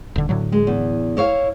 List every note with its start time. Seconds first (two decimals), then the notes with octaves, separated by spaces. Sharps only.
0.16 D#1 D3
0.29 A2 D3 F#3
0.52 G#3
0.67 E2
1.17 E4 C#5 F5